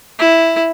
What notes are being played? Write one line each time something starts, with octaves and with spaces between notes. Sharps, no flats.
E4